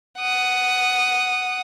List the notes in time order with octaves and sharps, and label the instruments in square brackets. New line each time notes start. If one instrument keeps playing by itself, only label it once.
[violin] F#5 D#6